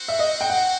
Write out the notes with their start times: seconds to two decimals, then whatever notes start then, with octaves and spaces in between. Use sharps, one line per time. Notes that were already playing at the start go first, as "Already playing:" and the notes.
Already playing: C4 F#4 C5
0.08 E5
0.19 D#5
0.41 G5
0.50 F#5